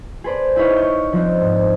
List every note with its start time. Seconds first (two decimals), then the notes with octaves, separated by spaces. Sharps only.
0.24 G#4 A4 B4 C5 D5
0.56 D#4 E4 G#4 B4 C#5 F5
0.77 C#6 G6
1.13 F3 C4 D4 D#4
1.41 G#2